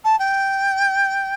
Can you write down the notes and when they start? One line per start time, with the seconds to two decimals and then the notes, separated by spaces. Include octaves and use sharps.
0.04 A5
0.19 G5